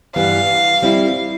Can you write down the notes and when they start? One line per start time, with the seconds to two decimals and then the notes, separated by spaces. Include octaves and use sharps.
0.16 G2 E3 G3 B3 F5
0.82 G3 C4 E4